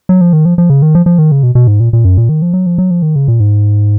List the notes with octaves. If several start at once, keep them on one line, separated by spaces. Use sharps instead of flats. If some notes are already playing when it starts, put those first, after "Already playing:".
F#3
F3
D#3
F3
F3
C#3
D#3
F3
F3
D#3
C#3
B2
B2
G#2
A#2
A#2
F#2
A#2
D#3
F3
F#3
F3
F#3
F3
D#3
C#3
A#2
G#2